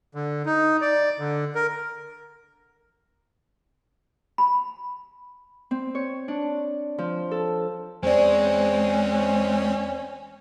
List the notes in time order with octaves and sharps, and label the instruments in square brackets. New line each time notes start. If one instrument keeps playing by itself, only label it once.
[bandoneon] D3
D#4
D5
D3
A#4
[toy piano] B5
[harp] C4
C#5
D4
F3
A4
[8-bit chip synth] E2 C4 [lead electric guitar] G#3 [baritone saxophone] C#4 [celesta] C5 D5